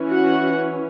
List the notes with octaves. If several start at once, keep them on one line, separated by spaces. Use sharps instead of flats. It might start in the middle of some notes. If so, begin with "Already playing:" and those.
Already playing: E3 C#4
F#4 F#5